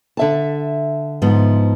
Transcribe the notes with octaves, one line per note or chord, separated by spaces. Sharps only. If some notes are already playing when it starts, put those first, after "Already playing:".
D3 E5 A5
G#2 F3 B3